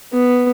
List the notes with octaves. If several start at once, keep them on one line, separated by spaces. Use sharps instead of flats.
B3